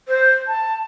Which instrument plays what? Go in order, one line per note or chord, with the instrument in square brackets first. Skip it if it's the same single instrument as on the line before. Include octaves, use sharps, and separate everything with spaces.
[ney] C5
A5